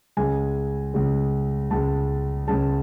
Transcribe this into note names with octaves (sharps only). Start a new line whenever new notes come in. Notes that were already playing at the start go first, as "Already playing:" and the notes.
C#2 C#3 G#3 G#5
C#2 C#3 G#3
C#2 C#3 G#3 A5
C#2 C#3 G#3 A5